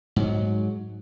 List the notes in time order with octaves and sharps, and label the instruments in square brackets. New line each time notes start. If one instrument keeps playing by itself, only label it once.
[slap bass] G#2 F#3